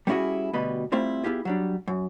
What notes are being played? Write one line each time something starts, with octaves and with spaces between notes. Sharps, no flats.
G3 B3 C#4 E4 F#4 G#4
D2 B2 G3 B4 D#5 B5
G3 A3 C4 E4 F4
B3 E4 F4 G4 G#4
F#3 G3 D4
F#2